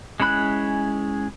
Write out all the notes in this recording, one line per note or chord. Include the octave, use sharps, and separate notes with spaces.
G#3 C#4 E4 B5 F#6